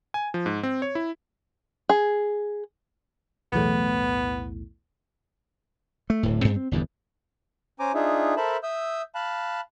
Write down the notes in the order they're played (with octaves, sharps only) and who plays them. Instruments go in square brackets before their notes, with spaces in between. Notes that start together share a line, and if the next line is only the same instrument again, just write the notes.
[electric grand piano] G#5
F3
G#2
C4
C#5
E4
[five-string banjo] G#4
[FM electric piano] B1 E2 A2 [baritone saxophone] B3
[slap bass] A3
D1 A2
G2 C4
C4
G1 E2 G2
[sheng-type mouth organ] C#4 C5 G#5 A#5 D6
D4 D#4 F4 G#4 E5
A4 A#4 C5 E5 A5 B5
E5 D#6 E6 G6
F5 A5 B5 F#6